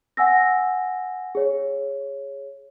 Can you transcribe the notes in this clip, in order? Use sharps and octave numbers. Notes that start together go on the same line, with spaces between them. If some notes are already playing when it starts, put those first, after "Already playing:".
F#5 G#5 E6 A#6
G#4 C#5